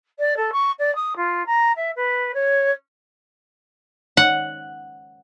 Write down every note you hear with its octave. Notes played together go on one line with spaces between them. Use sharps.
D5
A4
C#6
D5
D#6
F4
A#5
E5
B4
C#5
F#5